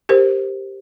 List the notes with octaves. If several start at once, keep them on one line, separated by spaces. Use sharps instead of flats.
G4 A#4 C5